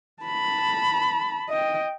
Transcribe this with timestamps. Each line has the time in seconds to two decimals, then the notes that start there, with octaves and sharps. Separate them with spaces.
0.23 A5 B5
1.49 D#5 G5